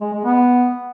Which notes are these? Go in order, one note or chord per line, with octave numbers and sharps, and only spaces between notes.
G#3
G#3
B3